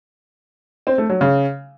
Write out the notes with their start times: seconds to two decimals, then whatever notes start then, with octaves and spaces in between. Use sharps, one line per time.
0.87 C4
0.98 A3
1.09 F#3
1.21 C#3